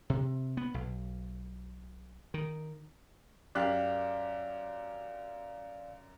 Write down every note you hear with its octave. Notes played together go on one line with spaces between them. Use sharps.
C3
B3
B1
D#3
F#2 G4 D5 F5 F6 F#6